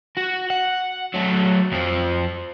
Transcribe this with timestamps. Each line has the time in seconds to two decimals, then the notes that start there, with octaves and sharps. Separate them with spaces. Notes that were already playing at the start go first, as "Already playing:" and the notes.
0.17 F#4
0.50 F#5
1.14 F#3 A3
1.72 F2 F3